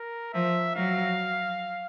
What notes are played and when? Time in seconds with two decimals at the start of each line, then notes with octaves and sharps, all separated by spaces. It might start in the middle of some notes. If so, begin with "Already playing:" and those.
Already playing: A#4
0.34 F3 E5
0.76 F#3 F5